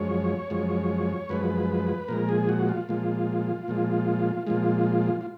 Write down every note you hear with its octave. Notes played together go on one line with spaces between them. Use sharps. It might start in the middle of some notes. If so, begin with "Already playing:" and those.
Already playing: F#2 F3 G#3 C#5
F#2 F3 G#3
F#2 F3 G#3 B4
A#2 F3 G#3 A#4
G#4
F#4
F4
A#2 F3 G#3
A#2 F3 G#3
A#2 F3 G#3 F4
F4